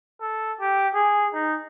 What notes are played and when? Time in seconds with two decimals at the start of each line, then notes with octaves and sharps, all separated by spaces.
0.20 A4
0.60 G4
0.94 G#4
1.34 D#4